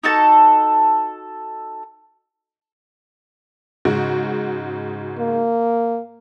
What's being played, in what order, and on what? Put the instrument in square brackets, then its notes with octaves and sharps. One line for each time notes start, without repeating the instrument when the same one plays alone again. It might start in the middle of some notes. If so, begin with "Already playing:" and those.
[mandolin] D#4 F#4 A4 A5
[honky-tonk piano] G#2 C#3 F#4
[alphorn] A#3